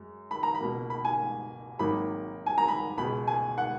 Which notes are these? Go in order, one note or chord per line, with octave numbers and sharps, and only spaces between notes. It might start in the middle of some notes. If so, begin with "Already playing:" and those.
Already playing: F#2 G#3
B5
A#5
B5
C#2 B2 A#3
B5
G#5
G#1 G#2 D#3 F#3 A#3 B5
G#5
A#5
B5
C#2 B2 G#3 B5
G#5
F#5